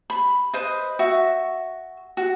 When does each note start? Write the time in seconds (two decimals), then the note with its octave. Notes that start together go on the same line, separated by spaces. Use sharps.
0.10 B5
0.54 B4 C5 D#5
0.99 F#4 E5 C#6
2.17 F#4